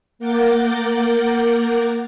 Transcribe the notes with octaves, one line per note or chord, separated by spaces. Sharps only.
A#3 A#4 F#5 D6 G6 A6